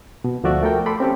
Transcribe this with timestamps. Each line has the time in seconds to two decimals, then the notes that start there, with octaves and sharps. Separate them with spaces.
0.24 B2
0.44 D2 F3 A3 F#4 D5 E5
0.63 A3 A4 A#4 G5
0.86 A4 B5 C6 D6
1.00 C4 C#4 G4 A4